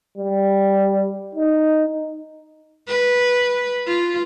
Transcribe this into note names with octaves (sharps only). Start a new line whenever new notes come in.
G3
D#4
B4
F4